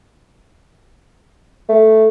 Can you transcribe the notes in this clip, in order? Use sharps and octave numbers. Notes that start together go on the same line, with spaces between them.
A3